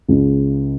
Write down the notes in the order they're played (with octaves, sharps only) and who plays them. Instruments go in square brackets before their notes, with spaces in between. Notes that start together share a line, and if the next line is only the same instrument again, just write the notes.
[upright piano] C#2 C#3